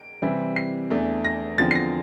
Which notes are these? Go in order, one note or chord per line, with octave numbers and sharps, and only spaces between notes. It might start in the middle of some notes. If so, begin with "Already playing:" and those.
Already playing: D7
C3 E3 G3 C4 E4
C7
E2 E3 A3 D4
A#6
E2 D3 F3 C4 A6
C7
A#6